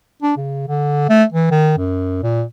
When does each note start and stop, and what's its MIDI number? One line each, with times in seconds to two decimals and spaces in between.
0.23 0.34 62
0.37 0.68 49
0.68 1.07 50
1.10 1.24 57
1.33 1.51 52
1.51 1.78 51
1.78 2.20 42
2.23 2.43 46